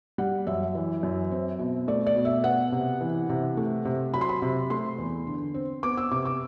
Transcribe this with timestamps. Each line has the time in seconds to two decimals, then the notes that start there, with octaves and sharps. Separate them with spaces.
0.18 G3 F#5
0.47 F#2 E5
0.75 E3
1.03 F#2
1.31 C4
1.59 B2
1.88 A3 D5
2.07 D5
2.16 B2
2.25 E5
2.44 B3 F#5
2.72 C3
3.01 E3
3.29 C3
3.57 A3
3.85 C3
4.14 F#3 B5
4.21 C6
4.29 B5
4.42 C3
4.70 A3 C6
4.98 E2
5.27 D3
5.54 C4
5.83 B3 D6
5.97 E6
6.11 C3 D6
6.25 D6